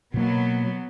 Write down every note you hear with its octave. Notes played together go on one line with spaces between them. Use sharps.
B2 F#3 A#3 B3